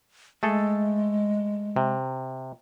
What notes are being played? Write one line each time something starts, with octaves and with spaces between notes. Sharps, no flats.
G#3 A3 G#4 A4
C3